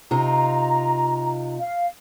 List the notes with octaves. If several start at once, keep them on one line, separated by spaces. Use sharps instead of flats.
C3 D#4 F4 A#5
F5